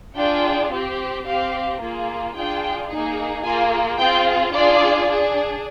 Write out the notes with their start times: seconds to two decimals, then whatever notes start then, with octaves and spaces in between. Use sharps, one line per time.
0.16 D4 F4 G#4 G5
0.71 C4 G4
1.25 C4 G4 F5
1.80 A#3 F4 G#4
2.34 D4 F4 G#4 G5
2.89 A#3 D#4 G#4
3.43 A#3 F4 G#4 G#5
3.98 C4 F4 G#4 G5
4.53 D4 F4 G#4 D5
5.07 D4 G#4